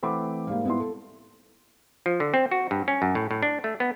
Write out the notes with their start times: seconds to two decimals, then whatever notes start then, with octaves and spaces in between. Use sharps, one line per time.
0.03 E3 A3 C4 F#5 B5 D6
0.47 G#2 G3 A#3 F5
0.65 B3 E4 C6
0.80 A4
2.06 F3
2.20 D3
2.34 C4
2.51 F#4
2.71 G2
2.88 C#4
3.02 F#2
3.15 A2
3.31 A2
3.43 D4
3.64 A3
3.80 B3